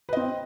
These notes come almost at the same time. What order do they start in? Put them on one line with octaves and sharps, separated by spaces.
B4 D#5 C4